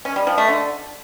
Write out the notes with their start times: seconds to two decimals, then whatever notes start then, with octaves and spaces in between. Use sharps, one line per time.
0.05 C#4
0.16 G3
0.27 F3
0.38 A3
0.49 D3